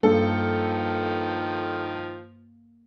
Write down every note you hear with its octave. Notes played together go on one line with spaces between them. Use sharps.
G2 D#3 F3 A#3 A4